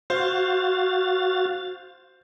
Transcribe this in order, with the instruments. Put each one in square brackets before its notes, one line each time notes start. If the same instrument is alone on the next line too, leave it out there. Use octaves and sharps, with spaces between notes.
[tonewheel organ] F#4 F5 A6 [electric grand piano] C5